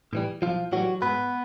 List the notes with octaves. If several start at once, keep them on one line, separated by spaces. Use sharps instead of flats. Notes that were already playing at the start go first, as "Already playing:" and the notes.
A2 E3 G3
B1 F3 F4
A2 E3 F#3 G3 F#4
G#2 B3 B4